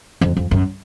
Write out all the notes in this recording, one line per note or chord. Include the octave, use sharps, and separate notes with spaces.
F2
F2
F#2